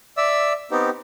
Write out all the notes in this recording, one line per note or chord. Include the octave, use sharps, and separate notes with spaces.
D5 E5 E6
B3 C4 D#4 G4